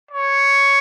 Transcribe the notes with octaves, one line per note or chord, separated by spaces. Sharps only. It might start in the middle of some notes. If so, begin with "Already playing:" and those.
C#5